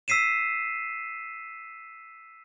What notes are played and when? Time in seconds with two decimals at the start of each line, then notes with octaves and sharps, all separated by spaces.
0.08 E6 B6 C7 D#7 E7